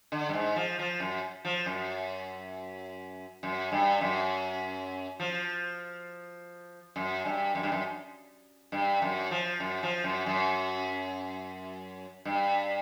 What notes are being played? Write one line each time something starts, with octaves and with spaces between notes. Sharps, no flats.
D3
G2
G#2
F3
F3
F#2
F3
F#2
F#2
G2
F#2
F3
F#2
G2
F#2
G2
F#2
G2
F#2
F3
F#2
F3
F#2
F#2
G2